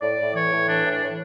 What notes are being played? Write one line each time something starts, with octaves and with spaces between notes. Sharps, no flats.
A2 D5
A2
E3 C#5
A2
E3 D4
A2
D4
A2